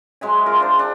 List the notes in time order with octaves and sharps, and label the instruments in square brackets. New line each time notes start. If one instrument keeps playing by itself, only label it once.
[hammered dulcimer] F#3 G#3 E5 G#5
F4 A#4
D4 G#4 C5
D4